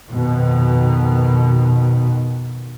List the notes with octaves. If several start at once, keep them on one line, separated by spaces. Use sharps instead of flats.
F2 B2 D#3